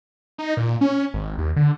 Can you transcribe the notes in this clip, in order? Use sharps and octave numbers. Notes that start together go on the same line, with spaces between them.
D#4
A#2
C#4
G#1
D#2
D3